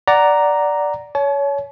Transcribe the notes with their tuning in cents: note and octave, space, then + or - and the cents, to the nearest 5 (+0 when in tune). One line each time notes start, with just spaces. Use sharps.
D5 +0 F#5 +10 A#5 +0
C#5 +20 A5 -45